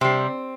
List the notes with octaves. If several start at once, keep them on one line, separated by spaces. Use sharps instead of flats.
C3 G3 C4